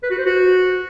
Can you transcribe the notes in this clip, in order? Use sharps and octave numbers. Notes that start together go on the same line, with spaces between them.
B4
F#4
C5
F#4